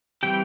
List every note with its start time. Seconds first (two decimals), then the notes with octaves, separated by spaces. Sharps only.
0.23 E3 G3 C4 G4 G5